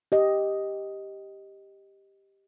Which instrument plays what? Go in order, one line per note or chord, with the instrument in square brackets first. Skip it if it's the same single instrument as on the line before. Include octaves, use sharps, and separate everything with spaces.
[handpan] G4 D#5